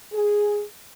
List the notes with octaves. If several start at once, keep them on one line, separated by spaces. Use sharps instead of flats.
G#4